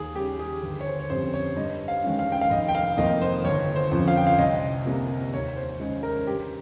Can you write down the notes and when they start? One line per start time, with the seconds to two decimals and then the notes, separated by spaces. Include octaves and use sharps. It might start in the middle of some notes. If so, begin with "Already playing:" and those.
Already playing: D#2 G#4
0.15 C#3 G3 C#4 G4
0.39 G#4
0.63 G1
0.81 C#5
0.87 C5
1.00 C#5
1.10 F2 C#3 G3 C4 C5
1.34 C#5
1.56 G2 D#5
1.88 F5
2.04 D#3 G#3 C#4
2.19 F5
2.32 G5
2.41 F5
2.50 F1 D#5
2.68 G5
2.75 F5
2.97 F2 D#3 A#3 D#5
3.22 C5
3.45 G1 C#5
3.76 C5
3.91 F2 C#3 F3
4.08 F5
4.17 G5
4.27 F5
4.39 C2 D#5
4.86 C3 G3 A#3
5.33 D#2 C#5
5.57 C5
5.80 C#3 G#3 D#4
6.03 A#4
6.27 G2 G4